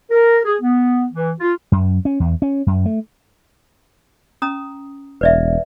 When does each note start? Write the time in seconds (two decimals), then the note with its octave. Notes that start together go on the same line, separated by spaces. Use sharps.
0.11 A#4
0.45 G#4
0.62 B3
1.13 E3
1.40 F4
1.72 F#2
2.05 C#4
2.20 E2
2.42 C#4
2.67 F#2
2.86 A3
4.42 C#4 A#5 D#6
5.21 E1 B4 D5 E5